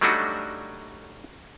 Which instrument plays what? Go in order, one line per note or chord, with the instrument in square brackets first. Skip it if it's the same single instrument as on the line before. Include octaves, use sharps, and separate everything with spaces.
[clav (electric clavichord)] F#3 G3 A3 D4 D#4 F#4